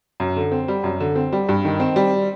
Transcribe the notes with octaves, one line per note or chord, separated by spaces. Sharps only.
F#2
D3
C4
G3
F#2
D3
C4
G3
G2
D#3
C4
G3